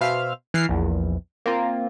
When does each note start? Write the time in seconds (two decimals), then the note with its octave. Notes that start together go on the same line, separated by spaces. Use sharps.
0.01 B2 C5 E5 F5 F6
0.54 E3 F6 C7
0.69 A#1 E2
1.46 A#3 C4 F4